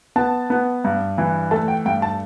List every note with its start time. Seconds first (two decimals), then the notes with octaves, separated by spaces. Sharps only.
0.16 B3 A5
0.50 B3
0.84 G2
1.18 E3
1.51 A3 A5
1.68 G5
1.85 G2 G5
2.02 A5